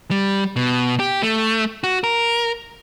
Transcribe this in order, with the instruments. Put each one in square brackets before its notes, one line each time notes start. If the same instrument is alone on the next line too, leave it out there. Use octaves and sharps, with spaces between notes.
[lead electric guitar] G3
B2
G4
A3
F#4
A#4